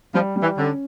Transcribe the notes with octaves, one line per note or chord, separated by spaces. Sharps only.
F3 G3
G3
E3
D3 C#4